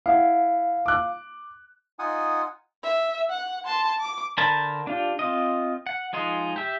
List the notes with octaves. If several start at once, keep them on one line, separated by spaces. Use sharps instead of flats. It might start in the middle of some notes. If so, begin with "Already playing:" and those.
E4 F5 F#5
D6 F#6
D#4 F4 F#5 G#5 D#6
E5
F#5
A5 C6
D6
D3 A#4 C5 A5 B5
D4 F4 G4
C4 F4 D#5
F#5
F3 G#3 D#4 C6
G4 E5